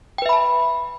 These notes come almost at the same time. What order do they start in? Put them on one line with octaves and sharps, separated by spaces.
G5 B4 E5 B5 A5